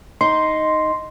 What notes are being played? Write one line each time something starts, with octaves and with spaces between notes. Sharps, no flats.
D#4 C6